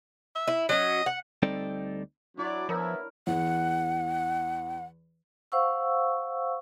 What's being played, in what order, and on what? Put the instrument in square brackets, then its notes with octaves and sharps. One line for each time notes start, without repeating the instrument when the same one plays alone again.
[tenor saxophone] E5
[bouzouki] E4
[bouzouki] F#3 C#4 [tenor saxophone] D#5
[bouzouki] F#5
[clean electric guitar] D2 G3 C4 D#4 A4 D5
[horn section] F#3 D5 [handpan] D4 E4
[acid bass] F3 [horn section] B3 E4 [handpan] A#4 C#5
[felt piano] E2 [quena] F#5
[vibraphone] C5 F5 F#5 C#6 E6